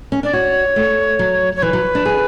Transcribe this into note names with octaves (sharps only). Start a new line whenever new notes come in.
C#4
D4 D5
F#4 C#5
A3
F#3
C#5
E3 B4
F#3
D4
G#4